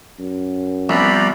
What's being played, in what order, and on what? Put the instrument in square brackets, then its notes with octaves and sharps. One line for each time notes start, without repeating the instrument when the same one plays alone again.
[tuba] F#2
[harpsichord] C2 [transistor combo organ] F3 G3 B3 [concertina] D5 A#5 B5